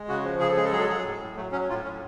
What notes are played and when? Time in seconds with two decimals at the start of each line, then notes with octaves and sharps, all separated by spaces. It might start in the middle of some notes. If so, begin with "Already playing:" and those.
Already playing: G#3
0.08 C#3 F#4
0.24 F3
0.39 C#3 G#4
0.49 A4
0.56 G#3 G#4
0.65 A4
0.72 F#3 G#4
0.80 A4
0.89 F#3 G#4
1.04 A2
1.20 A2
1.36 F#3 A3
1.52 F#3 C#4
1.69 A2 F4
1.84 A2 C#4